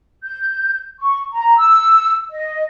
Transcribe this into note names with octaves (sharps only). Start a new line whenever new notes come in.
G6
C#6
A#5
E6
D#5